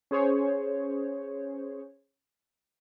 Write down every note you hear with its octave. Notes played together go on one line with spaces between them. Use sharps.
C#4 G#4 C5 C#5